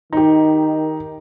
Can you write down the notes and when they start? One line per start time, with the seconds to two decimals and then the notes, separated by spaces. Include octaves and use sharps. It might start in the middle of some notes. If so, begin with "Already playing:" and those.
0.13 D#3 D#4 G4